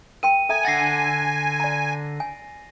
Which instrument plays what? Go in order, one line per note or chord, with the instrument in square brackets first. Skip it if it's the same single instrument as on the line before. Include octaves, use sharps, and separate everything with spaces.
[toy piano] A#4 G5 C6 [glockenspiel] D#7
[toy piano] A4 E5 A#5 [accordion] G#5
[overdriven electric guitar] D3 F#5 [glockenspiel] A6 A#6 C7
[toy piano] D5 A#5
G#5